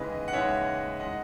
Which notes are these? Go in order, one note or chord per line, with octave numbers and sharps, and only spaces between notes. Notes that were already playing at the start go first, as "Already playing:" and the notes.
Already playing: D#2 C#3 E3 G#3 B4 D#5
F#5
D#2 C#3 E3 G#3 C#5 E5
D#3 G#3 D#5 F#5